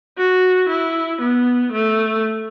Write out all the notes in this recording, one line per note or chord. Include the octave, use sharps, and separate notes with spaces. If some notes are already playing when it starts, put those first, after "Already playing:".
F#4
E4
B3
A3